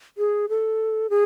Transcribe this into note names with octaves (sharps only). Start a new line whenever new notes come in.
G#4
A4
G#4